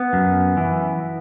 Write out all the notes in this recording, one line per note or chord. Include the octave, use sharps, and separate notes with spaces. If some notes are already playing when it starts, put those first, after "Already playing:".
Already playing: B3
F#2
E3